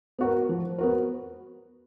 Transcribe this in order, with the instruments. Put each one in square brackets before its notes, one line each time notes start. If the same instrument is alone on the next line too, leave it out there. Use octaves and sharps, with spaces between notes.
[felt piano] B3 F#4 A#4
F3
B3 F#4 A#4